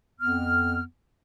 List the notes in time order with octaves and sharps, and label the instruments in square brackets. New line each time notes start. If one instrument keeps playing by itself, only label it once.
[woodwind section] F2 B3 F6